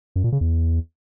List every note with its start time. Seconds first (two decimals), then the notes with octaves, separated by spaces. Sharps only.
0.16 F#2
0.24 A#2
0.32 C#3
0.41 E2